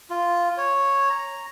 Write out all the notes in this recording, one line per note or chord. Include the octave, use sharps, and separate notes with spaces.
F4
C#5
A#5